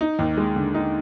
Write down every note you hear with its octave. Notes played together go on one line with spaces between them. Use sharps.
D#4
D#2
G#3
D3
D#4